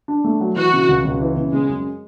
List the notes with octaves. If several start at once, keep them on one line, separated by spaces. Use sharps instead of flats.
D4
A3
F#3
E3 F#4
C#3
C#2
C#2
E3
C#3
C#3 G#3
F#2